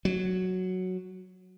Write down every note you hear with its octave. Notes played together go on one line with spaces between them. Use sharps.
F#3